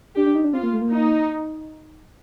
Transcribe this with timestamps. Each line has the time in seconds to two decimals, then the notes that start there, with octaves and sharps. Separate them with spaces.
0.16 D4 G4
0.26 D4
0.35 D#4
0.44 D4
0.53 C4 F4
0.63 A#3
0.73 A3
0.81 A#3
0.91 D#4